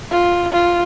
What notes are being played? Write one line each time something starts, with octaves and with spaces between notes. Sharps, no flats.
F4
F4